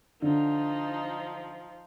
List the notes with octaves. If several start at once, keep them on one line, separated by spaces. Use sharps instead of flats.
D3 F3 D#4